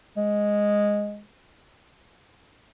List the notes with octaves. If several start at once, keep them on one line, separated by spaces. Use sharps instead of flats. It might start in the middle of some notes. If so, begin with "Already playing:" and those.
G#3